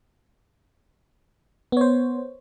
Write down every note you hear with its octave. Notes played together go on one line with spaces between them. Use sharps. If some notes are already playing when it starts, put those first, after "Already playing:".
B3 C5 C#5